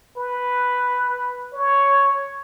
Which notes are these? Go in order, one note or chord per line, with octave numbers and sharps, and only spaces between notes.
B4
C#5